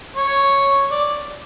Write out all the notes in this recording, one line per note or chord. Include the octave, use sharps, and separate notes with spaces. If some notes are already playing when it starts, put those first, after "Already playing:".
C#5
D5